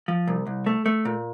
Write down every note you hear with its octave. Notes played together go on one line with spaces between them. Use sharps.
F3
C2
C2
A3
A3
A#2